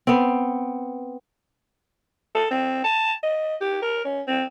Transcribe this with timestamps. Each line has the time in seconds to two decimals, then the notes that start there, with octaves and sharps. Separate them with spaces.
0.07 B3 C4
2.35 A4
2.51 C4
2.84 A5
3.23 D#5
3.61 G4
3.82 A#4
4.05 C#4
4.27 C4